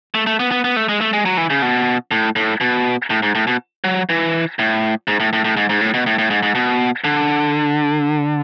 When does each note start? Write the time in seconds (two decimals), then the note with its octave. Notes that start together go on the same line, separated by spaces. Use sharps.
0.15 A3
0.27 A3
0.40 B3
0.51 B3
0.64 B3
0.76 A3
0.89 G#3
1.01 A3
1.13 G#3
1.25 F#3
1.37 E3
1.50 C#3
1.62 B2
2.11 A2
2.36 A2
2.61 B2
3.10 A2
3.23 G#2
3.35 A2
3.47 B2
3.84 F#3
4.09 E3
4.59 A2
5.08 G#2
5.20 A2
5.33 A2
5.45 A2
5.57 G#2
5.69 G#2
5.81 A2
5.94 B2
6.07 A2
6.19 A2
6.30 G#2
6.43 G#2
6.55 B2
7.04 D3